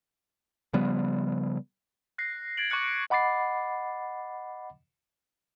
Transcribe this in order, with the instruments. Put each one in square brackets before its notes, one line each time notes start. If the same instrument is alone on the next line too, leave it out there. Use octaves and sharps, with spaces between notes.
[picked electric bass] C#3 F3 G3 B3
[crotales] F#6 A#6 C7
G#6 A6 D7 F#7
C#6 D6 F#6 C#7
[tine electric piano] D#5 F#5 B5 D6 A6 C7